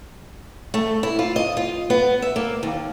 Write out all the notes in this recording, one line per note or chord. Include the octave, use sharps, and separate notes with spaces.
A3
E4
F4
D#5
F4
B3
E5
A#3
D#2